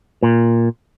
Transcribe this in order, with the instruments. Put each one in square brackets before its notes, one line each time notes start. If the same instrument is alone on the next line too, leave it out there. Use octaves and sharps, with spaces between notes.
[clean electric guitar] A#2